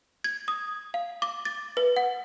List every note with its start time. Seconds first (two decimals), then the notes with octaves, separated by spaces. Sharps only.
0.24 G#6
0.48 D#6
0.94 F5
1.22 D6
1.45 A6
1.77 B4
1.96 F#5